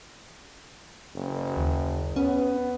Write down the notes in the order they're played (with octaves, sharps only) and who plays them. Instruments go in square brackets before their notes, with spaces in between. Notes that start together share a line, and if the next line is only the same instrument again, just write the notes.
[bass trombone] F#1
[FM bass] D#2
[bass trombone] B3 [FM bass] C#4